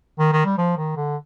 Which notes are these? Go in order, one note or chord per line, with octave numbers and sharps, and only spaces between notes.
D#3
D#3
G3
F3
D#3
D3